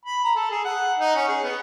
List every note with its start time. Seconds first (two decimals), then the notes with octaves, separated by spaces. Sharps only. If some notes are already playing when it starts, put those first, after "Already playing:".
0.06 B5
0.24 A#5
0.36 A4
0.51 G#4
0.65 F#5
0.99 D#4
1.16 C#4
1.29 G#4
1.44 B3